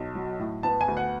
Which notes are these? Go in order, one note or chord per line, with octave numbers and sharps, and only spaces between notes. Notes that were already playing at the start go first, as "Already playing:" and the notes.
Already playing: B1
F#3
A2
B3 A5
G#5
D2
F#5